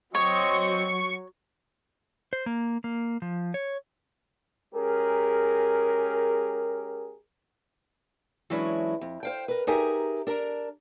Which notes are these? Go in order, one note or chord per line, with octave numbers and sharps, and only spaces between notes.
F#3 C4 C#5 D#5 C#6
C5
A#3
A#3
F3
C#5
G#3 C#4 G4 G#4 A#4
E3 F#3 G#3 C#4 D4 E4
F2
C5 F5 G5
A#4 B4
D#4 G4 G#4 A#4 E5 G#5
D4 A#4 A#5